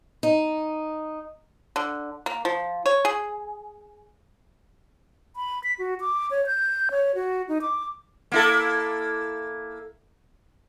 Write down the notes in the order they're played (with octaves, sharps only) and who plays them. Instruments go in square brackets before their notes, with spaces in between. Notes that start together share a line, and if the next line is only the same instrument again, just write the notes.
[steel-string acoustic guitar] D#4
[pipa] D3
A#3
F3
C#5
G#4
[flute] B5
B6
F#4
D6
C#5
G6
C#5
F#4
D#4
D6
[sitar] A#3 E4 A4